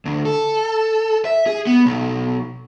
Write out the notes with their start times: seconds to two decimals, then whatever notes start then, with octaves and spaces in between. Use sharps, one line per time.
0.05 D2
0.25 A4
1.25 E5
1.47 G#4
1.67 B3
1.86 B1